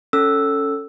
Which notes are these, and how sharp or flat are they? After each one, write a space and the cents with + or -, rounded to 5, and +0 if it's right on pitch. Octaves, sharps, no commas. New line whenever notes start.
C#4 +0 A4 +10 E6 +0